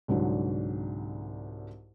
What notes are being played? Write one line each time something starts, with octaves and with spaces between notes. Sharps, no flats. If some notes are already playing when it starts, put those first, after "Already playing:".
C2 G#2 D3 F#3